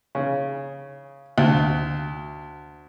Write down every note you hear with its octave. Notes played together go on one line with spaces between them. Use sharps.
C#3
D2